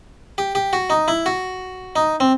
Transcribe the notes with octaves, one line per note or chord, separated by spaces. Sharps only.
G4
G4
F#4
D#4
E4
F#4
D#4
C4